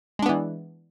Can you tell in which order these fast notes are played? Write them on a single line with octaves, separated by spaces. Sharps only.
G#3 D4 B3 E3